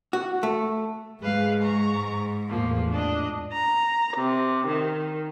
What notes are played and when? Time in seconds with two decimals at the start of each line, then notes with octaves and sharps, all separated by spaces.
0.13 F#4
0.43 A3
1.23 G#2 G#3 B4 F5
1.63 A#5 C#6
2.49 E2 A2 F3 A#3
2.90 D4 D#5
3.52 A#5
4.16 C3
4.67 D#3